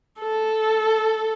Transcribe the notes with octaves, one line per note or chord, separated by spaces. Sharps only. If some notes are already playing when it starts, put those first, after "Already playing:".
A4